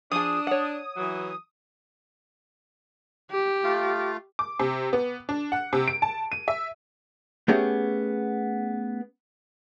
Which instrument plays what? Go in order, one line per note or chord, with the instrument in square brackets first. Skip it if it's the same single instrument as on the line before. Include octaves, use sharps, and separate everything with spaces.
[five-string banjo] F3 G#4 [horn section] D4 [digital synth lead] D#6
[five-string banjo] C#5 F#5
[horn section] E3 F#3
[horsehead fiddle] G4
[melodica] A3 F4 F5
[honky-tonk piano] D6
C3
B3
D4
F#5
C3
D7
A5
D#7
E5
[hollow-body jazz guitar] A3 B3 C#4 G4 G#4